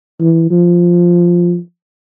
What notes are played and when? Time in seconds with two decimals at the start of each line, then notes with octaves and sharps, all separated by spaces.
0.20 E3
0.51 F3